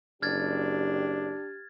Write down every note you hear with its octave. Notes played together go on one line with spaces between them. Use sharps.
F#1 D4 G4 F6 G#6 A6